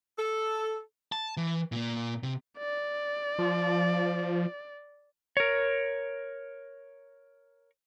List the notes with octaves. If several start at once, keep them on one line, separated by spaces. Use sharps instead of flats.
A4
A5
E3
A#2 A#3
C3
D5
F3
A#4 C#5